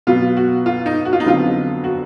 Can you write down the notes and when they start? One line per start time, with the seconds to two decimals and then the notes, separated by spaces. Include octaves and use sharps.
0.07 B2 F#3 B3 F4
0.37 F#4
0.66 F4
0.86 D#4
1.05 F#4
1.13 F4
1.20 D#4
1.25 F2 D3 F#3 B3 F4
1.84 F#4